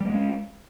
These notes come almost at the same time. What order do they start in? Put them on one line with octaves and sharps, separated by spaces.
G3 A#3 G#3 C#4